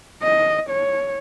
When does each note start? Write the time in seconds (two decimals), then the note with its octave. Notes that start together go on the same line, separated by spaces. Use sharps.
0.23 D#5
0.70 C#5